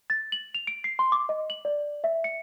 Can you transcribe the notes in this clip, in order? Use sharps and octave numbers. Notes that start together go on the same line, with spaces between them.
A6
F#7
F7
D7
C7
C6
D6
D#5
F#7
D5
E5
C#7